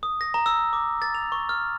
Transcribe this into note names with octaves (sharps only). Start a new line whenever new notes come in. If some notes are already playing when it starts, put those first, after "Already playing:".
D#6
A#6
A#5
E6
D6
A6
F7
C#6
F6